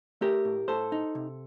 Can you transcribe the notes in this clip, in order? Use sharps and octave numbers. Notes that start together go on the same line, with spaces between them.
A3 G4 A#4
A2
A2 A4 C5
D#4
C3